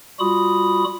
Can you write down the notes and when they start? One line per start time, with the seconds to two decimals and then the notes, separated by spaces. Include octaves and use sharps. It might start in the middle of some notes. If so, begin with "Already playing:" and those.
0.19 G3 F4 F#4 B5 D#6